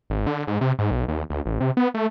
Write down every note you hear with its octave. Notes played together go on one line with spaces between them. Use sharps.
G#1
D3
G#2
C3
G#2
B1
D#2
D2
A1
C3
B3
A3